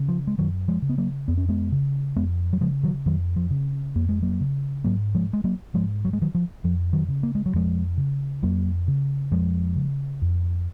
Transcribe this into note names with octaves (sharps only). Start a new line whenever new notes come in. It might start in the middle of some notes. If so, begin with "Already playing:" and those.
Already playing: C#3
F3
G#3
F#2 D#3 F#3
F3 G#3
C#3
B3
F#3 A#3
F2 B3
C#4
G#3 B3
C#3
F2 G#3 B3
F#3
C#3 F3 G#3
D#3 F#3
F2 D#3 F#3
F3
C#3
F2 A#3
G#3
F#3 A#3
C#3
G#2 F#3 A#3
F3 G#3
G#3
F#3 A#3
G#2 F3 G#3
F#3
G#3
D#3 F#3
F3
F2 F3
D#3 F#3
C#3
A#3
G#3
F#3
F2 F3 G#3
C#3
F2 F#3 A#3
C#3
F2 F3 G#3
C#3
F2